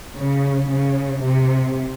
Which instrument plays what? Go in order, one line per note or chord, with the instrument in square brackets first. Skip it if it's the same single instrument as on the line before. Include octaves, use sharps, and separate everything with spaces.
[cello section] C#3
C#3
C3